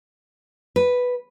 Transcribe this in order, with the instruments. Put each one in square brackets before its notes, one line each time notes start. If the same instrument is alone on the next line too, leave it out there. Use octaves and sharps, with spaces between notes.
[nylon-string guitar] B4